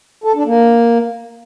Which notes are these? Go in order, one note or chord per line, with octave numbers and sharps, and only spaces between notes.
A4
D4
A#3